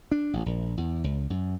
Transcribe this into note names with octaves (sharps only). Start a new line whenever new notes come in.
D4
A1
A#1
E2
C#2
F#2